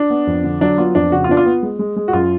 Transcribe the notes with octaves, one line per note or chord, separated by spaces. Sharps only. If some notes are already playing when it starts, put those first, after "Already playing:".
Already playing: D4
B3
F2
D3
F#3 D4
B3 F4
F2 D4
C#3 F#4
F4
B3 D4
F4
B3
G#3
G#3
G#3
F#4
F#2 F4